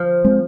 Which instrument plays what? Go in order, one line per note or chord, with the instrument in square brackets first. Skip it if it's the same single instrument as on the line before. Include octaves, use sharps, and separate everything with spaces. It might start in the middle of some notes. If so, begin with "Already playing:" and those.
Already playing: [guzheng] F3
[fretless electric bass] G#3 C4